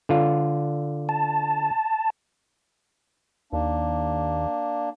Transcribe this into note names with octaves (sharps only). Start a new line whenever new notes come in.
D3 F4
A5
D#2 A#3 D4